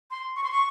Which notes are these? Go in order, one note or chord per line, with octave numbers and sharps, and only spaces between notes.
C6
C#6
C6
C#6